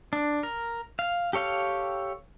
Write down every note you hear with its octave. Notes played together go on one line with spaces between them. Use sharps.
D4
A#4
F5
G4 A4 C#5 F5 G5